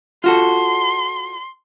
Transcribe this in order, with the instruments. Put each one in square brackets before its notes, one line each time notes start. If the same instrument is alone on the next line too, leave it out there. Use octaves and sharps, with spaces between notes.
[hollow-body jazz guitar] F4 F#4 A4 [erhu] C6